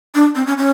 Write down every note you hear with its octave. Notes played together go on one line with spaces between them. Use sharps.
D4
C4
C#4
C#4